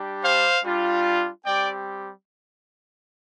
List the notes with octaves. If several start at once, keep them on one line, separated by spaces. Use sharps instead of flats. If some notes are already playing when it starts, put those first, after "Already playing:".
Already playing: G3 D4 G4
C5 F5
G3 D4 F4
G3 C4 G4 D5 G5